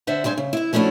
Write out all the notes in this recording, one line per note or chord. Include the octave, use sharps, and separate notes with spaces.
D3 C5 E5 F#5
G2 G3 C5 G#5
C#3
E4 E5
F3 A3 C#4 D4 E4 F#4